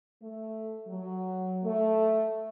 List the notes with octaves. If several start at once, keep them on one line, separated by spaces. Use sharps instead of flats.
A3
F#3
A3